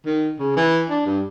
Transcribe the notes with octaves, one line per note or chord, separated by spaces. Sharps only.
D#3
C#3
E3
D4
G2